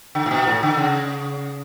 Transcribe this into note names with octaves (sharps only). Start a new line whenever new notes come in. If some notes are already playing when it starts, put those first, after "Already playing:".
D3
A2
B2
A2
D3
C#3